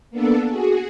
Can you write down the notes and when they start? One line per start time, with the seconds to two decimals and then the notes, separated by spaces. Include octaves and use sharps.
0.11 A#3 B3 D4 A4
0.48 F#4 G#4